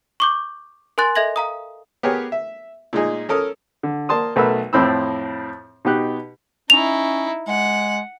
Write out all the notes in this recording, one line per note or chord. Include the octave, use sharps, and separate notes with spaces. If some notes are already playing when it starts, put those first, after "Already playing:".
C#6 D6 G6
A#4 G#5 C6 F#6 A6
A4 D#5 E5 G#6 A#6 F#7
F5 A#5 D#6
B3 G4 G#4 A#4 C#5
E5
A#2 G#3 D#4 G#4
C#4 A4 A#4 D#6
D3
A#3 D5 A5 C6 D#6
B1 A3 A#4 B4 B5 E6
F2 A2 C4 B5 E6
B2 D#4 G4 F#6
C#4 D#4 E4 F7
G#3 F#5